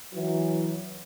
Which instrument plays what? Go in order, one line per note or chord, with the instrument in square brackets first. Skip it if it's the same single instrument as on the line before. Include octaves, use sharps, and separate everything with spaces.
[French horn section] E3 F#3